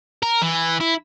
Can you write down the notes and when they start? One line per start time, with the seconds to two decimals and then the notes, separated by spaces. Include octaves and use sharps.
0.23 A#4
0.42 E3
0.80 E4